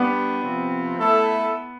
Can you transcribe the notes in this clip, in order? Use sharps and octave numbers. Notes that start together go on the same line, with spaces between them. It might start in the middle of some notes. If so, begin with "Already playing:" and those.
Already playing: G3 B3 D4 G4 D5
C3 F3 C4
A3 E4 A4 E5